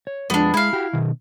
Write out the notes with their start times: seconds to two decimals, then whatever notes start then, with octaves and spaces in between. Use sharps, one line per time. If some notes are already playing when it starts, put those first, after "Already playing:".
0.07 C#5
0.30 F2 F3 G#3 B3 D4
0.54 G#3 E4 F5
0.73 F#4 G4
0.93 B2 D#3